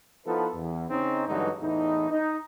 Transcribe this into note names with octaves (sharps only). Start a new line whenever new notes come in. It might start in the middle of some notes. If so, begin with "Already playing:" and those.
F3 B3 D#4 E4 A4 B4
E2
C#3 C4 C#4 D#4
G2 D3 E3 F#3 G#3 D#4
E2 A2 E3 D#4
D#4